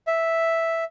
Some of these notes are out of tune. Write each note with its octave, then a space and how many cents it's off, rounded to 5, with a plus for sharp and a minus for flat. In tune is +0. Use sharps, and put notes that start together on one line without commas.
E5 +0